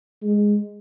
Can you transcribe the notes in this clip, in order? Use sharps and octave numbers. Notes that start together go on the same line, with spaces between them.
G#3